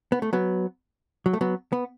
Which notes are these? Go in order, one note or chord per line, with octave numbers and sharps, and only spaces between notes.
B3
A3
F#3 B3
F#3
A3
F#3 B3
B3